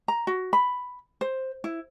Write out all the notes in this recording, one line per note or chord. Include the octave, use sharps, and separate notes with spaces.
A#5
F#4
B5
C5
E4